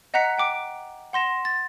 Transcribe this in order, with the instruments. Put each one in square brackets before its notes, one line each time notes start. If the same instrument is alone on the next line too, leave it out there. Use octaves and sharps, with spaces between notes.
[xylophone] D#5 F#5 A#5 F#6 B6 C#7
F#5 G5 D6 D7
F#5 C6 A#6 E7
A6